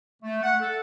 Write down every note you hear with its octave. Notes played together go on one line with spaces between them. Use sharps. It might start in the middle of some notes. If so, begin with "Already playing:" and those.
A3
F#5
A4